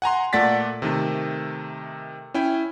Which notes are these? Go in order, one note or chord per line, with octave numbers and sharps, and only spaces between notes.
F#5 G#5 A#5 C6
A#2 A3 D5 F#5 A6 B6
C3 D#3 A3
C#4 E4 G5